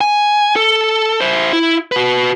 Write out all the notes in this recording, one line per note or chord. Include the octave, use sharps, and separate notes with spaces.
G#5
A4
E4 C5
E4
F#4 B4